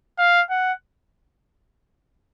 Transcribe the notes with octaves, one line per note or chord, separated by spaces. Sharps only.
F5
F#5